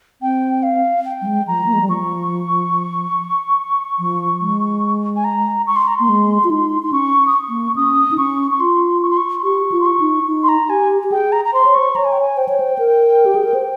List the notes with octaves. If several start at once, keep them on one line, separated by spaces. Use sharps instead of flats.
C4 G5
F5
G5
G3
G#3
F3 A#5
A#3
G#3
G3
F3 C#6
F3
G#3
G#5
A#5
C#6
C6
A#5
A#3 C6
G#3
F4
D#4
D#4 C6
C#4 C#6
D#6
C#6
A#3
C#4 D#6
D#4
C#4 C#6
C#6
F4 C6
C#6
C6
C#6
C6
G4 C#6
F4
C6
C#6
D#4
D#4
C6
A#5
G4 G#5
G4
G#4 G5
A#5
A#5
C5 C6
C#5
C5 C#6
C#5 A#5
G#5
G5
G#5
C5 G5
C#5
C5
A#4
G4
G#4
A#4
C5